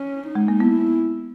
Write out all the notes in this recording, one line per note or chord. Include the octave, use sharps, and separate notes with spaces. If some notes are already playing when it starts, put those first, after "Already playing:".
Already playing: C#4
D#4
G#3
A#3
B3 E4